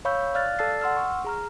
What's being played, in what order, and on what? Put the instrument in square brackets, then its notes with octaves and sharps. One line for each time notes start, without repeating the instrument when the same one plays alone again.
[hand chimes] C#5 F5 B5 C#6 E6 G6
D5 F5 F6 F#6 A6
A4 D5 A5 E6 A6 C7
F#5 C6 E6 F6
C#6
G#4 A#5 F6